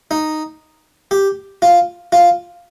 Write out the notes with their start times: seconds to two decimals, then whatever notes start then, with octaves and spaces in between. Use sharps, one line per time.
0.11 D#4
1.11 G4
1.62 F4
2.12 F4